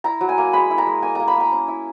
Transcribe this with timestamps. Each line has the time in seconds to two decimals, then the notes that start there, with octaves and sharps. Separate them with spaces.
0.04 E4 A#5
0.21 F#3
0.29 G#5
0.38 A#3
0.53 G#3 B5
0.71 E4
0.78 A#5
0.87 G#3
1.02 A#3 G#5
1.15 A#3 A#5
1.28 B5
1.36 A#3 A#5
1.52 C#4
1.68 E4